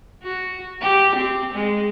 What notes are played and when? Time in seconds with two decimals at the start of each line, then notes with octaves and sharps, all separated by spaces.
0.23 F#4
0.81 G4
1.16 C4
1.54 G#3